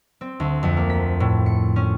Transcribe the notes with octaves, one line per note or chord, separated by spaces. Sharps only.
C4
D2
F2
A#3
B6
A2
C#7
C#4